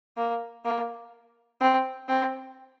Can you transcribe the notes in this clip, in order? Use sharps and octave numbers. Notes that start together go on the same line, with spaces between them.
A#3
A#3
C4
C4